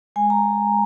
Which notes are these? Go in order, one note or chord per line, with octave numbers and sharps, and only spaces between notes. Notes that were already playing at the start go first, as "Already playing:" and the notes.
G#3 G#5
A#5